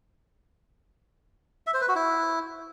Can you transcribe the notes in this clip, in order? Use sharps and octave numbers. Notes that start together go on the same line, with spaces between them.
E5
C5
B4
F#4
E4